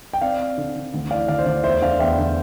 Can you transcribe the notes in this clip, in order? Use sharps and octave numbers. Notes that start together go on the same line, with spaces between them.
G5
C4 D5 F5
C4
D3
D3
D2
E3 D5 F5
D2 D5 F5
C5
D2 D5
E2 C5 E5
D3 D5 F5
E2 E5 G5
D3